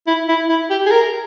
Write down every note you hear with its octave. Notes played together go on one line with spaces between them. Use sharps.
E4
E4
E4
G4
G#4
A#4